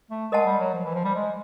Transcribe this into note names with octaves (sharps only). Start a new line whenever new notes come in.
A3
G#3 A#4 D#5 F#5 A5
G3
F#3
F3
E3
F3
G3
G#3